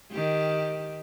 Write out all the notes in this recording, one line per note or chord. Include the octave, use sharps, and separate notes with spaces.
D#3 G4